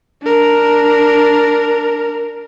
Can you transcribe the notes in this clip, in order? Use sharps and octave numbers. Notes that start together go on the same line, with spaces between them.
D4 A#4